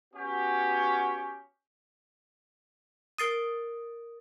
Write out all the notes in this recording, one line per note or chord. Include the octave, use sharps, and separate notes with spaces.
B3 C#4 F#4 G4
A#4 D#6 A6 C7 D7 D#7